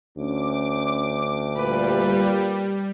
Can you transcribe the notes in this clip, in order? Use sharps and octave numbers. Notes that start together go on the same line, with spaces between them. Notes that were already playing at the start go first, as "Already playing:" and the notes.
D2 C#4 D6
A#2 G3 B4